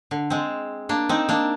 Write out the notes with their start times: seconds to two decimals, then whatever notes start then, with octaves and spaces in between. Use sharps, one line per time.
0.11 D3
0.30 G#3 C4
0.89 A#3 D4
1.09 C4 D#4
1.29 A#3 D4